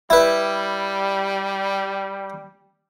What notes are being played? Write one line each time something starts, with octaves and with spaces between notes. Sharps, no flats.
G3 E4 B4